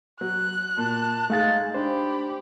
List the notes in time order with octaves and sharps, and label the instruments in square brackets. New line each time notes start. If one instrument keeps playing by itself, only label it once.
[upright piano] F#3 [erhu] F#6
[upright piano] A#2 [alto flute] A5
[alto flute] G#3 [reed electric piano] A3 F5 A6 [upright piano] D#4 G#4
[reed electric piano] D4 C5 [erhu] G4 [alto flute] B5